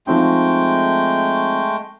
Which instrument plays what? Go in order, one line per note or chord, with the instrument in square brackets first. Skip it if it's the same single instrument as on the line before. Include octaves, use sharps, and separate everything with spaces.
[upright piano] F3 C4 D#4 [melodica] G#3 A3 G5